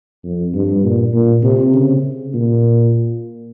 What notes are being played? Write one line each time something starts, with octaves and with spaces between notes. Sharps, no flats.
F2
G2
A#2
A#2
C3
C#3
A#2